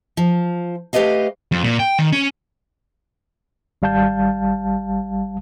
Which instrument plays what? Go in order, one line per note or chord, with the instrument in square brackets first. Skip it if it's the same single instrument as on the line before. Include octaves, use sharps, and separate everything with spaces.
[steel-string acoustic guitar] F3
A3 G4 G#4 B4 D#5 F5
[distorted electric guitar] F2
A#2
G5
D#3
C#4
[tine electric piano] G#1 G3 F5 A5 G6